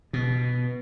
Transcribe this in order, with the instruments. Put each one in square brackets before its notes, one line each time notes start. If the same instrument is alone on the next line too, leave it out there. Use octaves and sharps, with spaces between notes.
[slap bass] B2